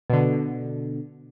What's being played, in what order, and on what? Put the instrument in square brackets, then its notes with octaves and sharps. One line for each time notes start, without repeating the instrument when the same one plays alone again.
[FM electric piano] B2 D3